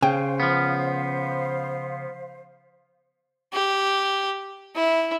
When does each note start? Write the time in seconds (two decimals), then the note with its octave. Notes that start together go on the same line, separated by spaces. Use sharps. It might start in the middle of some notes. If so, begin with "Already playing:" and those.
0.02 C#3 C5 F5 G5
0.40 F3 B3
3.53 G4
4.75 E4